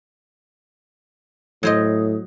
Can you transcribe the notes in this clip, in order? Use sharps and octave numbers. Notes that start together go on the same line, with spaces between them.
A2 F#3 C5 D#5